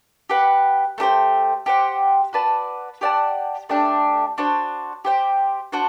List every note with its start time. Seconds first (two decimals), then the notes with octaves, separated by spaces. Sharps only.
0.30 G4 B4 F#5
0.98 A3 D4 G4 C5
1.66 G4 C5 F#5
2.33 F#4 B4 D5 A5
3.01 G4 D5 F#5 A5
3.69 A3 D4 G4 D5
4.38 D4 F#4 C5
5.05 G4 C5 G5
5.72 D4 F#4 C5